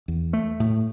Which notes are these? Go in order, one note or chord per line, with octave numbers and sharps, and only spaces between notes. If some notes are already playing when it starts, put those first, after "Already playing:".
E2
A3
A2